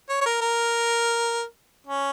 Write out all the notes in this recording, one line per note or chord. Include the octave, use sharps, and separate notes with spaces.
C#5
C#5
A#4
A#4
C#4